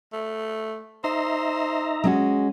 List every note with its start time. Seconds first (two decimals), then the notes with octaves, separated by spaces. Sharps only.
0.13 A3
1.04 D#4 C5 E5 A#5
2.04 G#3 C#4 F#4